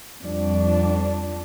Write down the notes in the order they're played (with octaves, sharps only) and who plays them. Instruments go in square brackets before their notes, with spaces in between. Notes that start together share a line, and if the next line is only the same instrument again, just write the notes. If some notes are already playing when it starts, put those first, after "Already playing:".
[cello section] F2 G3 D4